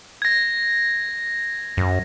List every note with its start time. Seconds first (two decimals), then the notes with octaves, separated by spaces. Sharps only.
0.22 G#6 A#6
1.77 F#2